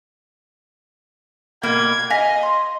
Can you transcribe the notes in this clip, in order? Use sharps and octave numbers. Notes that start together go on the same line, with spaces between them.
B2 A#3 G#6
D#5 F5 G#5 A#6 B6
C6